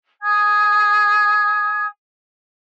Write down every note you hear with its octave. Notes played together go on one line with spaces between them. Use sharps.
G#5 D#6 G#6